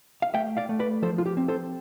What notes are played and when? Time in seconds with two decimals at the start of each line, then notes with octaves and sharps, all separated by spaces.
0.22 F5
0.34 A3 E5 G5
0.57 D5 F5
0.69 A3
0.79 B4 D5
1.02 F3 A4 C5
1.18 F4
1.26 G4
1.37 C4
1.48 A4 C5